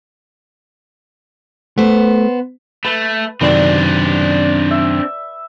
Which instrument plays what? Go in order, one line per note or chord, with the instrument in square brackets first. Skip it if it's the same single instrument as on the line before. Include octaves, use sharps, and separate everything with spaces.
[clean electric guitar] A3 [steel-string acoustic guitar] B3 C5
[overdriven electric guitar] A3 [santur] B4
[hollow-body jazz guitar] F#2 C3 D#3 [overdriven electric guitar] C4 D4 [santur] B4 D5
[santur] E5